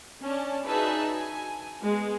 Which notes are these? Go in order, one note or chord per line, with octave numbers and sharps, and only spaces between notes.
C#4 D4 A5
D#4 F#4 G#4 B4 E5 A5
G#5
G#3 B3